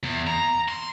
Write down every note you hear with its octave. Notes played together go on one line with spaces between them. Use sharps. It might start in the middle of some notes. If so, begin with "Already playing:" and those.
E2
A#5
C6